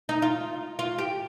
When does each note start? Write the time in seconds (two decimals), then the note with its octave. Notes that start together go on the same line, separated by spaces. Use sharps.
0.09 D#4
0.22 F4
0.79 F4
0.98 G4